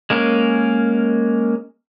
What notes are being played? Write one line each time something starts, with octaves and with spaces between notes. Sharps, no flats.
G#3 A#3 C#4 A#4